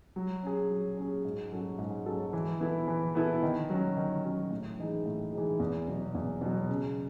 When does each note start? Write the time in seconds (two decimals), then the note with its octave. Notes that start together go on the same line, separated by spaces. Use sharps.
0.16 F#3
0.42 C#4 G#4
0.70 F#3
0.97 C#4 G#4
1.25 G#2
1.52 F#3 C#4 F#4 A4
1.79 G#2
2.06 F#3 C#4 F#4 A4
2.33 E3
2.60 B3 E4 A4
2.87 E3
3.15 B3 E4 A4
3.43 D#3
3.70 F#3 C#4
3.97 D#3
4.23 F#3 C#4
4.51 A2
4.79 E3 G#3 D#4 G#4
5.06 A2
5.32 E3 G#3 D#4 G#4
5.60 E2
5.88 B2 F#3
6.15 E2
6.41 B2 F#3
6.69 C#3